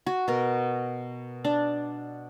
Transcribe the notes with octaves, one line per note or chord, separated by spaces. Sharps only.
F#4
B2 A#4
D4